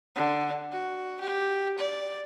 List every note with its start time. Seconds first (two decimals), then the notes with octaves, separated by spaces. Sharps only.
0.16 D3
0.71 F#4
1.21 G4
1.79 D5